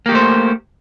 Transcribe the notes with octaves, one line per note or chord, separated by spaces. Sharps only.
A3 A#3 G4 C5